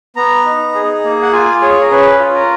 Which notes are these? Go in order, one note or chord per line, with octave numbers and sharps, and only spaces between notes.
B3 A#5
D#4
G#4
A#3
F#5
F4 G#5
G#4 C#5
A#4
C#4 B4
F4
A#4